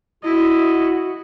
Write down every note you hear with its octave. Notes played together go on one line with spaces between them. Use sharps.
E4 F#4 D#5